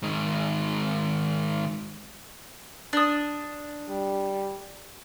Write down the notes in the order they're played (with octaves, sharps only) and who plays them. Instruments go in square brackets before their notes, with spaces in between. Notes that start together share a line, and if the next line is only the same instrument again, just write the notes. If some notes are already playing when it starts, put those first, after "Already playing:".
[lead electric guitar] G#2 D#3
[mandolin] D4 D#6
[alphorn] G3